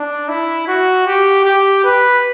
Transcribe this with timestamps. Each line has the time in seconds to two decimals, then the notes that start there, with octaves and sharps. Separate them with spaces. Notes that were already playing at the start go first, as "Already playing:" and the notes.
Already playing: D4
0.29 E4
0.68 F#4
1.07 G4
1.45 G4
1.84 B4